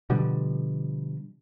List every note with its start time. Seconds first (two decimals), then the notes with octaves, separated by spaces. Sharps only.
0.10 B2 D3 F3 G3